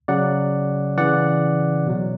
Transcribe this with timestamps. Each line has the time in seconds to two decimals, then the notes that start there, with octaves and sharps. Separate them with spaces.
0.08 C#3 F#3 D5 F#5
0.98 C#3 E3 D5 F#5
1.87 B2 F#3